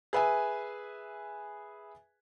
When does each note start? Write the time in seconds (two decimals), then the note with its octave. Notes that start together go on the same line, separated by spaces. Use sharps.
0.13 G#4 B4 E5 G#5